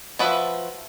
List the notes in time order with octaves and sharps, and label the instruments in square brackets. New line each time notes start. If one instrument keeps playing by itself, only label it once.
[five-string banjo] F3 F#4 B4 E5